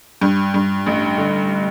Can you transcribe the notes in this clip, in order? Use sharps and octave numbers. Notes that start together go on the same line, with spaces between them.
G2
G2
A1
D3